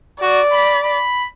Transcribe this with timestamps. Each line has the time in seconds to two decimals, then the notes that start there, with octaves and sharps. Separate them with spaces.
0.22 F#4 D5
0.52 B5
0.84 B5